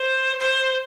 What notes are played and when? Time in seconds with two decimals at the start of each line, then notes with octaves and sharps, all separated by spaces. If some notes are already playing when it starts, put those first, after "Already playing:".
Already playing: C5
0.39 C5